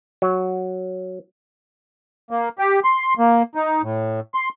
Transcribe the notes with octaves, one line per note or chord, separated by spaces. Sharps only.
F#3
A#3
G4
C6
A#3
D#4
A2
C6